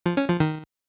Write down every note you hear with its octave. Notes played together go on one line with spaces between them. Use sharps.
F3
C#4
F3
D#3